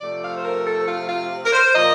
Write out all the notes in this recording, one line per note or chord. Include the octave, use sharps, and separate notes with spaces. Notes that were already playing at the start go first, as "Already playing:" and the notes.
C3 F3 A3 D5
F5
C5
A#4
A4
F4
F4
A#4
C5
A#2 F3 A#3 D#5